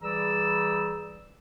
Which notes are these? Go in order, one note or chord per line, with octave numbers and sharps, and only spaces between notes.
E3 G3 G#4 D5 A#5 E6